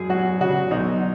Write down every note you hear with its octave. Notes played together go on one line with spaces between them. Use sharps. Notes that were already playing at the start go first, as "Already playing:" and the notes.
Already playing: F#2 G#4
F#3 F#4
C#3 F#4
B1 D#4